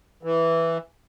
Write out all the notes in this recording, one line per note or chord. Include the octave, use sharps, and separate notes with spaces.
E3